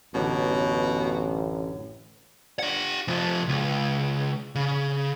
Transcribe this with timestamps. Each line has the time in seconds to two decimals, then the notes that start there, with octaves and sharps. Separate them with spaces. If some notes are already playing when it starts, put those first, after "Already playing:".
0.14 A1 F#2 B2 D3
2.59 G4 F#5
3.08 C3 F3
3.49 C#2
4.55 C#3